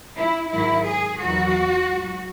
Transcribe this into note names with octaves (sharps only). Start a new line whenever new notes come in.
E4
G#2 D#3 F#3 E4
G#4
E2 D#3 F#3 F#4
G#2 F#3